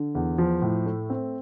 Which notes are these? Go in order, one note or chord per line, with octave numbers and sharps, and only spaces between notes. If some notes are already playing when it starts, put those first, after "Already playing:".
Already playing: D3
E2
F3
A2
A3
C4